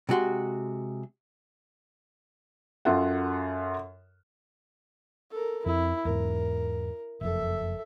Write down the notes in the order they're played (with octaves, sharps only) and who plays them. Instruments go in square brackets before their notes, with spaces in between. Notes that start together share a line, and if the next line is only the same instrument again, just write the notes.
[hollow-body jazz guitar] C3 G#3 F#4 C6
[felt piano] F#2 F4 A4 F#5
[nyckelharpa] A4 A#4
[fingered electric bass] F2 C4 [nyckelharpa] E4
[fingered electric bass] E2 G#2 [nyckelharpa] A#4
[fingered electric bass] F#1 F2 [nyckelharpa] A4 E5